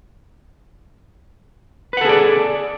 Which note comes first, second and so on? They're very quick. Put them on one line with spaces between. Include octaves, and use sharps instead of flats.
B4 F#5 A4 G#4 D5